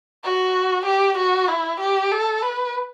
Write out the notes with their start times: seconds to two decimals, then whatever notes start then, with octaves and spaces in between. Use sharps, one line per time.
0.24 F#4
0.86 G4
1.18 F#4
1.49 E4
1.80 G4
2.12 A4
2.43 B4